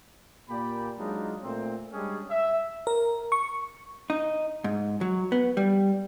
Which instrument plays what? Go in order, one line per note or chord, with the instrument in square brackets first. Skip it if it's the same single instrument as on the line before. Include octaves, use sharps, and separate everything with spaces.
[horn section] A#2 A#3 G4 D5 B5
F#3 G#3 D4 D#4 F4
A#2 A3 C4
G3 G#3 C#4 D4 G#4
E5
[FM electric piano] A#4
C#6
[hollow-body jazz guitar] D#4
G#2
F#3
B3
G3